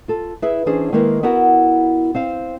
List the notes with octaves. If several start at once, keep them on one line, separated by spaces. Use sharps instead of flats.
F4 A4
E4 G#4 B4 E5
E3 C#4 D4 G#4 C5
D#3 G#3 A#3 E4 A#4 B4
B3 E4 F#4 A#4 F#5
C4 C5 F5